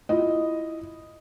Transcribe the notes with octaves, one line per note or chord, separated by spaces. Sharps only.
E4 F4 D#5